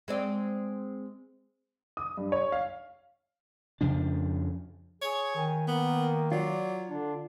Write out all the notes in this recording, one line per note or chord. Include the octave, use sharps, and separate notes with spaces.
G#3 C4 D5
D#6
G2
C#5
F5
F2 C#3 F3 D4
G#4 C#5
D#3 G#5
A#3 B3
F#3 F4 D5
D3 D4